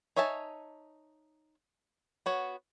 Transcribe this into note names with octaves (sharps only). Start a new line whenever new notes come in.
D#4 C#5 E5 G#5 A5
B3 F#4 C#5